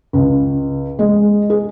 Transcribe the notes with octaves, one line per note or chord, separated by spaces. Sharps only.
C#2
G#3
G#4